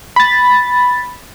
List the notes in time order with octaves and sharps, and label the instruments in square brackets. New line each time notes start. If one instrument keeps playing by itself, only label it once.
[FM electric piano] B5 A6